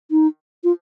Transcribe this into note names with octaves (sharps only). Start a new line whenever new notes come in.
D#4
F4